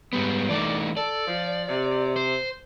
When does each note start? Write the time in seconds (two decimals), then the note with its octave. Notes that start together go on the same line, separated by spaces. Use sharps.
0.13 G#2 G3 B3
0.50 E3 A3 D#4 D5
0.97 A4 D5
1.27 F3
1.69 C3
2.16 C5